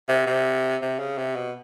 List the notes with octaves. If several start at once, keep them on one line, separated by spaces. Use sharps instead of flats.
C3
C3
C3
C#3
C3
B2